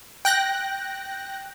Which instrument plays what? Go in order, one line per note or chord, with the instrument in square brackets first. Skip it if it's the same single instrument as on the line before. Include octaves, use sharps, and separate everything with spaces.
[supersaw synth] G5 F#6 A#6